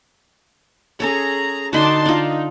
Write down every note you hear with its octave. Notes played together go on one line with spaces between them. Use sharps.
C#4 G#4 A4 C#5 A#5
D3 D4 D#4 F#4 A5 C6
D4 D#4 F4